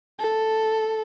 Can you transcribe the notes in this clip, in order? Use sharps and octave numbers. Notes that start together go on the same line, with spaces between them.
A4